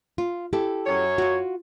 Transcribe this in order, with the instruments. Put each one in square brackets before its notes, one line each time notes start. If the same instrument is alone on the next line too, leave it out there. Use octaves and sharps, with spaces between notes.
[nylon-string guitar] F4
E4 G4 A4
[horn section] F#2 C#5
[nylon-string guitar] F4 F#4